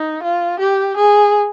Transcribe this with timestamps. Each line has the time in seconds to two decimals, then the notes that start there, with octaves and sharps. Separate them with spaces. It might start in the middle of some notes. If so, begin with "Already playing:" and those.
Already playing: D#4
0.23 F4
0.59 G4
0.96 G#4